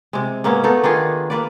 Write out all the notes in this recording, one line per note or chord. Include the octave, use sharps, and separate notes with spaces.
C3 G#3
G#2 A#3 B3 C#4
A3 B3 D#4 A4
D#3 D4 F4 G#4
A#3 B4 D5